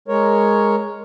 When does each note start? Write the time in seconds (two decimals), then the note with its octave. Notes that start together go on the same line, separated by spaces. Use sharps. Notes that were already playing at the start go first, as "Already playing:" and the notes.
0.08 G#3 A#4 C#5